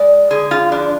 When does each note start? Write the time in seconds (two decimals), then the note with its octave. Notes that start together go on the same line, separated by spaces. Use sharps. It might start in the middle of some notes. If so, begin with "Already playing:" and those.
Already playing: G#3 D5
0.31 D3 G#4
0.51 F4
0.72 F3 D4